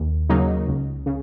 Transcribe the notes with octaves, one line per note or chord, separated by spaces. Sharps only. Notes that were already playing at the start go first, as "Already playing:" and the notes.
Already playing: D#2
C#3 F#3 A#3 D#4
C#2
C#3